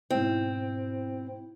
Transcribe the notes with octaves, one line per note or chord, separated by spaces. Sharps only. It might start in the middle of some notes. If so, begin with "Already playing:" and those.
G#2 B2 C4 E4